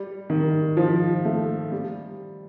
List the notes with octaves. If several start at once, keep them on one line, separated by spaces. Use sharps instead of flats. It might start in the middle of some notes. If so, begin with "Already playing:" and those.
Already playing: G3
D#3
F3
A3
G3